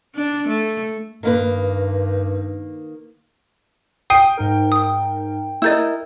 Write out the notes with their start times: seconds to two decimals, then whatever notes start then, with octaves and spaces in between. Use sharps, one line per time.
0.16 D4
0.48 A3
1.23 G2 D#3 A#3 B4
4.10 G5 D#6 C7 D#7
4.37 G#2 D#4 A#4
4.72 D#6
5.62 E4 A#4 D#5 E6 G6 A6